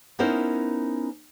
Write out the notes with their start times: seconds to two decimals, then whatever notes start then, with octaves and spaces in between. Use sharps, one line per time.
0.19 B3 C#4 D#4 E4 A#4 C5